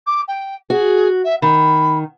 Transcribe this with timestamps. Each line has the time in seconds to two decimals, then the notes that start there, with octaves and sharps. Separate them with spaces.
0.07 D6
0.28 G5
0.70 F#4 G#4
1.25 E5
1.42 D#3 B5